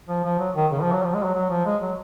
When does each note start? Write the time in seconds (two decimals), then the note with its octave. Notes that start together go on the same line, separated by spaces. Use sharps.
0.08 F3
0.24 F3
0.39 F#3
0.55 D#3
0.71 C#3
0.82 F3
0.92 F#3
1.03 F3
1.14 G#3
1.24 F#3
1.34 F#3
1.50 F3
1.66 G#3
1.82 F#3